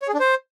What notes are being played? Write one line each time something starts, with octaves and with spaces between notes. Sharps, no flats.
C#5
G#4
D4
C5